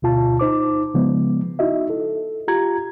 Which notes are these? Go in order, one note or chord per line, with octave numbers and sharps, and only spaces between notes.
D2 B2 F4 A5
D#4 C5 D6
C#3 F3 G#3 B3
D#4 E4 F#4 D#5 E5
A4
F4 G4 A#5 G#6